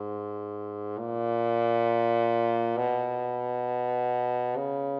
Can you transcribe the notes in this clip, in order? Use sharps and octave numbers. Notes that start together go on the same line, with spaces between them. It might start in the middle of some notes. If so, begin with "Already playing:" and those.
Already playing: G#2
A#2
B2
C#3